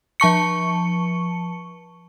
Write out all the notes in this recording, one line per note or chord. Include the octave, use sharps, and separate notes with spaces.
F3 A5 C#6 C#7